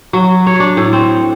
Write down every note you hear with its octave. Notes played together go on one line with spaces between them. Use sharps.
F#3
C#5
D4
A2
C4